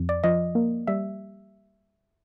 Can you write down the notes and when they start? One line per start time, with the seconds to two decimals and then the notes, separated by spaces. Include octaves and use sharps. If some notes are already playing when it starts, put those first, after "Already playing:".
Already playing: F2
0.09 D5
0.24 F3 D#5
0.55 A#3
0.87 G3 E5